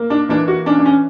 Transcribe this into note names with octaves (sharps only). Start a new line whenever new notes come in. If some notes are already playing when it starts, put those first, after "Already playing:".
Already playing: A#3
D4
E3 D4
F#4
C#4 D4
D4
C#4